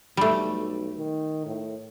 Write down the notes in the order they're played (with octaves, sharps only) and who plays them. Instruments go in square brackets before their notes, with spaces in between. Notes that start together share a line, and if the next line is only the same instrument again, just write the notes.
[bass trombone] B1 [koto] G3 A3
[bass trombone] D#3
A2